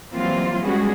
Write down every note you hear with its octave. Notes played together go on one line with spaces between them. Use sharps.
E3 F#3 G3 A#3 C4 F4
G3 G#3 B3 C#4 F#4 G#4